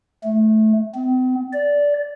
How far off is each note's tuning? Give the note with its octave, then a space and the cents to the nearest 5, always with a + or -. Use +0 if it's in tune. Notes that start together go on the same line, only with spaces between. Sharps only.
A3 -15
C4 -45
D5 -15